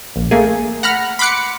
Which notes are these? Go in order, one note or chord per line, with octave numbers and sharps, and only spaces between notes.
A#1
A3 A#3 G#4
F#5 A#5 B5 F6
B5 C6 D6 F#6 C#7